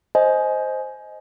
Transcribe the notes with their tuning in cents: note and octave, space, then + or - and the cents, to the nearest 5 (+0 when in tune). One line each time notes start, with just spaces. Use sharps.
C5 +0 D#5 +5 G#5 +25